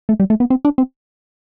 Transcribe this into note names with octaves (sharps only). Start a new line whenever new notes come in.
A3
G3
A3
B3
C4
D4
C4